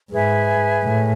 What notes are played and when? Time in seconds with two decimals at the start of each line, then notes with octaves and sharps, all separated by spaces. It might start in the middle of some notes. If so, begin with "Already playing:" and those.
0.11 G#2 G#4 B4 E5 G#5
0.84 A2